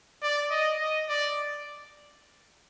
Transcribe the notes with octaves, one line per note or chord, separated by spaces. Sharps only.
D5
D#5
D#5
D5